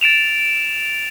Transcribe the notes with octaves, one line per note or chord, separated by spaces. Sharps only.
A6 D7 E7 F7